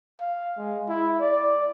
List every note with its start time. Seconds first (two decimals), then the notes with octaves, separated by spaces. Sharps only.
0.21 F5
0.57 G#3
0.88 E4
1.21 D5